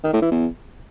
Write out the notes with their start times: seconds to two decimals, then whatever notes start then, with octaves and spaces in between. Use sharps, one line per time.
0.04 D#3
0.13 A2
0.22 E3
0.31 E2